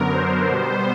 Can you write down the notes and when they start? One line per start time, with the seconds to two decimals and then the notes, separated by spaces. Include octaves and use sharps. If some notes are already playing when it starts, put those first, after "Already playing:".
Already playing: F#2 D3 F#3 B3 A#4
0.12 C5
0.48 B2 G3 B3